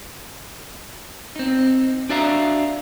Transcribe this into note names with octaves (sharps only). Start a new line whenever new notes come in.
C4 D#4
D4 F#4 D5 E5 F5 A#5